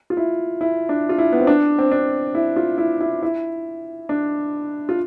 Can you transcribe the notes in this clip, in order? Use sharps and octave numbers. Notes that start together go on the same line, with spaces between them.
F4
E4
E4
D4
F4
E4
B3
C4
D4
C4
D4
E4
F4
E4
E4
E4
D4
F4